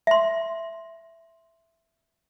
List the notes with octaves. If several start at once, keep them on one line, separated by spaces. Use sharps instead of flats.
E5 C6